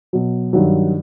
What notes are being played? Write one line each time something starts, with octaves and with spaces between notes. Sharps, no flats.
B2 F#3
G2 D#3 F#3